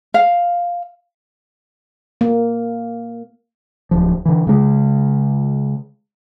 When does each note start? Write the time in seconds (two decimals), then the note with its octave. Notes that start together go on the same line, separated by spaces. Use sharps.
0.14 F5
2.21 A#3
3.91 D1 F3
4.26 D3 E3
4.47 C#3 G#3